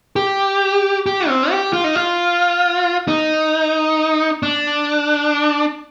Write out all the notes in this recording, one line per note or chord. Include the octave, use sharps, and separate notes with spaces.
G4
G4
C4
G4
F4
D#4
F4
D#4
D4